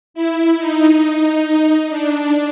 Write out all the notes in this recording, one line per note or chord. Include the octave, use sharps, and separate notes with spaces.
E4
D#4
D4